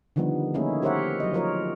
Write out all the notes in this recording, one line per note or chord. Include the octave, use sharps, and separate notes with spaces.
D3 D#3 F3 G3 B3
A3 A#3 C#4 D#4 E4 G#4
G4 A#4 C5 C#5 E5 F#5
F#3 D#5
F3 F4 A#4 C#5